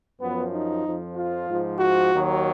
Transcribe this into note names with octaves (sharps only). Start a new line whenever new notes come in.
F#2 F3 B3
D#4
F2 F3
F4
G#2 F3
F#4
D#2 D#3 F#3